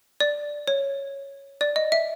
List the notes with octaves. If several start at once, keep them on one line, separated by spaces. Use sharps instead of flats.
D5
C#5
D5
D#5
E5